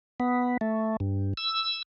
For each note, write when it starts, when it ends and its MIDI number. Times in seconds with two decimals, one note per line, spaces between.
0.20 0.57 59
0.61 0.96 57
1.00 1.33 43
1.37 1.82 88